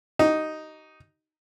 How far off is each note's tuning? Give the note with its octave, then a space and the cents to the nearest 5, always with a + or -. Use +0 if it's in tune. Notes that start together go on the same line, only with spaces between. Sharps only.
D#4 +0 G4 -40